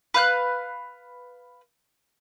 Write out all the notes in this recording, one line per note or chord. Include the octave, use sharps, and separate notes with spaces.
B4 F5 F#6